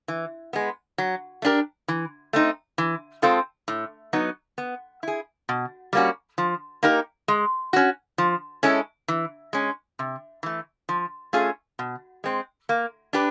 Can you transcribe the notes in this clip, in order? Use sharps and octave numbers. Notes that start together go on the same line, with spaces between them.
E3
G#3 B3
F#3
A3 D4 G4 A#4
E3
A3 C4 D#4
E3
G#3 C4 F4 A4
A2
F#3 B3 D#4
B3
E4 G#4
B2
G3 A#3 C#4 F#4
F3
A#3 D#4 G4 A#4
G#3
C#4 F#4
F3
G#3 C#4 E4 A4
E3
G#3 C#4
C3
E3 A3
F3
A3 C#4 F4 G#4
B2
G#3 C4
A#3
D4 G4 B4